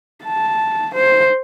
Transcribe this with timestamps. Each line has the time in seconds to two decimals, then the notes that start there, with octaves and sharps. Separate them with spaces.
0.25 A5
0.94 C5